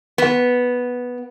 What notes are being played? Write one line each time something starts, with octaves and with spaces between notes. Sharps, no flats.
B3